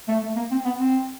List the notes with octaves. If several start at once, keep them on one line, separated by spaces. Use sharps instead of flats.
A3
A3
A#3
C4
B3
C4